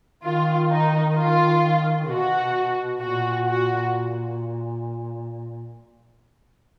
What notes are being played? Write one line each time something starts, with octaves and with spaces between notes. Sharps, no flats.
D#3 F4
D#4
F4
B2 F#4
A#2 F#4
F#4